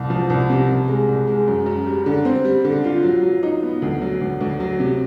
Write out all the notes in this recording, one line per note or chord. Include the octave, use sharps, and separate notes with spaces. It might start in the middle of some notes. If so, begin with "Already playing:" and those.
Already playing: C2
F3
C2
C3
C2
G#3
C2
G#3
F#2
F#2
G3
D3
C4
G3
D3
F4
F#3
F#3
D#4
B3
D2
F#3
D2
D2
F#3
C3